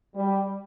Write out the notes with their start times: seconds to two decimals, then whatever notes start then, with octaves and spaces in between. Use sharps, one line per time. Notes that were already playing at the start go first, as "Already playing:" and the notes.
0.15 G3